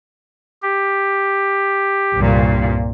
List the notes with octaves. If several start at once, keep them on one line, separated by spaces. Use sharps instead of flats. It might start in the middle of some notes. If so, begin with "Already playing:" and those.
G4
C2 G2 A#2